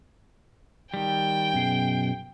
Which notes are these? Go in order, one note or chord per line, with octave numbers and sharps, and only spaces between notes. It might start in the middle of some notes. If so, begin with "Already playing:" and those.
D#3 G3 G5
F#2 B2 G#4